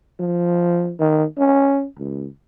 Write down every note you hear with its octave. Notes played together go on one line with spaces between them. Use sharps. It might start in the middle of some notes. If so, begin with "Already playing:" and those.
F3
D#3
C#4
C#2